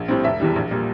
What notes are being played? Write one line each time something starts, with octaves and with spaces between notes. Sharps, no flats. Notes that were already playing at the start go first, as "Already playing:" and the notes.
Already playing: A#1
A2 G3 C4
F1 E5
E2 E3 G3
A#1
A#2 G3